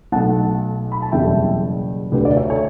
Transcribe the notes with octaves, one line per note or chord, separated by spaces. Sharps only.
B1 B2 A3 F#5 A5
B5
A5
F#1 E2 B2 G3 E5 G5
D2 D3 A3 G4 B4
B4 D5
C#5 E5
A4 C#5